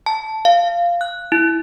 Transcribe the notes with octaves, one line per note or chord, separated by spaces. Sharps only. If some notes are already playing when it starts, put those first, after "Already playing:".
A5
F5
F#6
E4